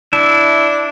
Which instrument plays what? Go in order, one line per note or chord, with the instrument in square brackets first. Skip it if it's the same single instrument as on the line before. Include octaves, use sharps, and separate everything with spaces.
[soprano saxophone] D4 [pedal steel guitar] E4 E5